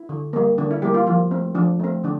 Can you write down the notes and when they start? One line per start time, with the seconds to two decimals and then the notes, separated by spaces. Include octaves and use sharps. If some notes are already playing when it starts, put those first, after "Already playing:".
Already playing: E4
0.09 D3
0.33 G3 A#3
0.58 D3 D4
0.71 E4
0.82 G3 A#3 G4
0.94 F4
1.06 F3 F4
1.31 A3 C4
1.55 F3 D4
1.80 A3 C4
2.04 D3 D4